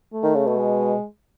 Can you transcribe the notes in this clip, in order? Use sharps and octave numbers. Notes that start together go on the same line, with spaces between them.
A3
D#3
C#3
B2
G#3